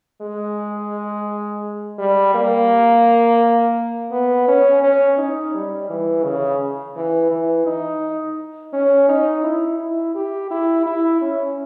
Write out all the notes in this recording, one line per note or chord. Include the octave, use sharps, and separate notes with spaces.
G#3
G3
A#3
B3
C#4
C#4
D#4
G3
E3
C#3
E3
E3
D#4
C#4
D#4
E4
E4
G4
E4
E4
C#4